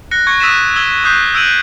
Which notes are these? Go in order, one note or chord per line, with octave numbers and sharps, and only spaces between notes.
F#6 A#6 C#7
C#6 G#6 A#6 C#7
D#6 E6 A6 B6 D#7 E7
E6 G#6 G7
C#6 D#6 F#6 G6 B6 C7
E6 G#6 D7 D#7 F#7